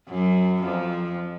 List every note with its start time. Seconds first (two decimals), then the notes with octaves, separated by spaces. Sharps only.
0.09 F#2 F#3
0.63 F2 F3